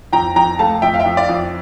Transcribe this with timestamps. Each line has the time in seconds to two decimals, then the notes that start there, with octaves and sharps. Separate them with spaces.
0.13 F2 G5 A#5
0.36 F2 G5 A#5
0.59 A3 F5 A5
0.82 F2 E5 G5
0.94 F5
0.99 E5 G5
1.06 F2
1.17 D5 F5
1.29 F2